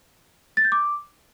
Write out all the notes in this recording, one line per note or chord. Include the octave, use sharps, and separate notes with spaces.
A6
G6
D6